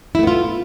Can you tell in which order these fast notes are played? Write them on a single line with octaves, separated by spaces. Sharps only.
E4 A3 B3 F4